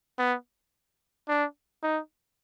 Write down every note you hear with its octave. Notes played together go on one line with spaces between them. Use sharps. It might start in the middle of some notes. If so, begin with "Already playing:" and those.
B3
D4
D#4